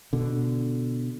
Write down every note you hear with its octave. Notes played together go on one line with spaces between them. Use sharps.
B2 D3